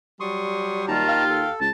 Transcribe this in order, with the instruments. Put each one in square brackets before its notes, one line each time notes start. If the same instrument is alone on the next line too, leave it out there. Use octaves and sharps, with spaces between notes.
[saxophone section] F#3 G3 [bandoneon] C6 C#6 D#6
[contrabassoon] D#2 [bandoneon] D#3 A5 A#5 [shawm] F4
[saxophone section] G4 F5
[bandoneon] A4
[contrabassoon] C#2 [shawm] A5